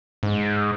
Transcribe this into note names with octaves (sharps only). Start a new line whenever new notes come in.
G#2